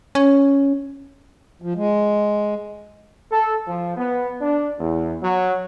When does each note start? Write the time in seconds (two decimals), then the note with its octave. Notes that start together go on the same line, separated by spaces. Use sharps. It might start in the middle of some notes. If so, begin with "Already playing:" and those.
0.15 C#4
1.62 F3
1.75 G#3
3.32 A4
3.67 F3
3.97 B3
4.42 D4
4.80 E2
5.23 F#3